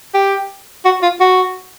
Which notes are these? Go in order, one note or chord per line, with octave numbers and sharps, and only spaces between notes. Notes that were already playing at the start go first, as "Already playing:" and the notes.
G4
F#4
F4
F#4